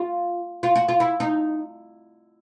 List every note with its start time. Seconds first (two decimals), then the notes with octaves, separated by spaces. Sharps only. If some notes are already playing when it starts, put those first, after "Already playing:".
Already playing: F4
0.63 F4
0.75 F#4
0.88 F4
1.00 E4
1.20 D#4